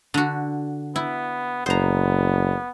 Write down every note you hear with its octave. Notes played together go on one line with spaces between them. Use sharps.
D3 F#4
B3 E4
F#1 B3 C5 A#5